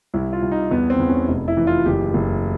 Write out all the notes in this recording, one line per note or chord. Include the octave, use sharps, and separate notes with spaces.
C2 E4
F4
C2
D#4
E2 B3
C4
E2
C#4
F1
E4
E3
F4
F#1 G4
F#1